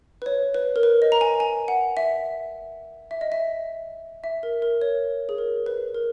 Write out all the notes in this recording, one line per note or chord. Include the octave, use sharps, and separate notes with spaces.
B4
C#5
B4
A#4
B4
D#5
A#5
G#5
G#5
F#5
E5
E5
D#5
E5
E5
A#4
A#4
C#5
G#4
A#4
B4
A#4